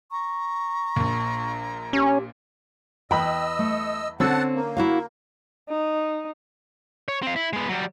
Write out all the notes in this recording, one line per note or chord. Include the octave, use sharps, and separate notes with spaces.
A#5 C#6
A#1 A#2
C#4 G4
E2 B4 D#5 G5 B5 E6
A3
D3 C4 C#4 A4 F#5 A5 E6
A#3
E4 F#4 F5
D#4
C#5
C4 F5
E4
G#3 B3
F#3 G3